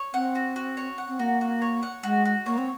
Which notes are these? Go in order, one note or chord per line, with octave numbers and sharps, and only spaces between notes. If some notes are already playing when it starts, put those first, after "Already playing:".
Already playing: C#5
C4 F#5
F#4
F#4
C#5
F#5
C4
A#3 F#4
F#4
C#5
F#5
G#3 F#4
F#4
A#3 C#5
C4